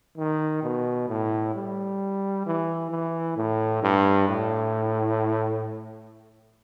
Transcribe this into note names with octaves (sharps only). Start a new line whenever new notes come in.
D#3
B2
A2
G3
E3
E3
A2
G2
A2